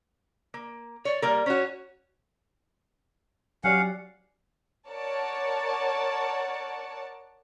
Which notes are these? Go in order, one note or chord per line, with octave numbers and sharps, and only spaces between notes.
A#3
C#5 D5
G3 A#3 A#4
C#4 F#4 C#5
F#3 C#4 G4 D5 F5 F#5
A#4 C#5 D5 F#5 A5